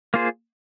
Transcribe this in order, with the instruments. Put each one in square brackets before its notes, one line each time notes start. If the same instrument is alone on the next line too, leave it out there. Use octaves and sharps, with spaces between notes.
[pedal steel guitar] A#3 F4 G#4 C5